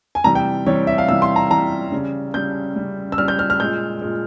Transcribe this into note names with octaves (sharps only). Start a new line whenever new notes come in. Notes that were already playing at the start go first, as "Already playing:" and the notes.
G#5
C3 E3 G3 A#5
G5
C3 E3 G3 C#5
E5
F5
C3 E3 G3 E6
C6
A#5
C3 E3 G3 A#5
C#3 G3
C#3 G3 G6
C#3 G3
E6
C#3 G3 F6
G6
F6
F6
A#2 G#3 G6
A#2 G#3